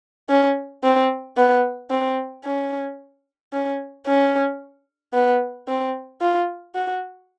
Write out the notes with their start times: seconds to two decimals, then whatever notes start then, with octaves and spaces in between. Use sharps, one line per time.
0.30 C#4
0.84 C4
1.37 B3
1.90 C4
2.45 C#4
3.53 C#4
4.06 C#4
5.14 B3
5.68 C4
6.21 F4
6.75 F#4